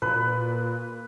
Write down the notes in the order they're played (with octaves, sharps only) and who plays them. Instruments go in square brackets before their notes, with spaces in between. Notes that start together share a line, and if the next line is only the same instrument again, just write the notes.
[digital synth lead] A#2 [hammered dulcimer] B4